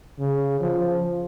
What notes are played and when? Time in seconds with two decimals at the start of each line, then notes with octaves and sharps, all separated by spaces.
0.19 C#3
0.61 F3